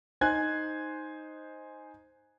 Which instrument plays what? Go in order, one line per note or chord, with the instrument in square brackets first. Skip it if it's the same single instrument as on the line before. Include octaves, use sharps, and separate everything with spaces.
[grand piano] D#4 C5 G#5 F#6 G#6